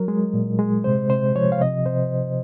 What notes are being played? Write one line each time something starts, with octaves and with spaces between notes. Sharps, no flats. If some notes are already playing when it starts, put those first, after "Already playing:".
Already playing: F#3 A#4
G#3
A#2
G#3
C3 C5
C3 C5
F3 C#5
F5
C3 D#5
C3 C5